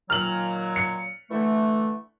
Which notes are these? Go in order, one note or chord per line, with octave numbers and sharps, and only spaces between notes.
A#2 D#3 F#3 F6 F#7
C#7
D3 E3 A3